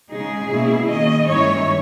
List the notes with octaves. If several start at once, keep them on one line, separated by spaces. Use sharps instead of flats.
C#3 G#3 D#4 G#4
B2 A#3 C#4 E4
D#3 A#3 C#4 D#5
G2 D#3 G#3 C#4 E4 C#5